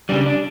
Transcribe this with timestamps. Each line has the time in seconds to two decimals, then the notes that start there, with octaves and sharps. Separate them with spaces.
0.09 C#3 G3 D4
0.26 D4